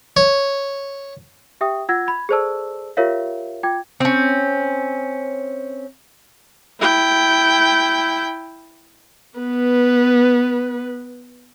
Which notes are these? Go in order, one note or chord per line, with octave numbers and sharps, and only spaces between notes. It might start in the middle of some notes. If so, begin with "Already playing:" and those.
C#5
G4 E5 G5 D#6
F4 F#5 E6 G#6 A#6
B5 G#6
G#4 A4 C5 D5 A5 E6
F4 G4 A#4 C#5 E5 F5
F4 G5 D6 G#6
C4 C#4
E4 G5
B3 B4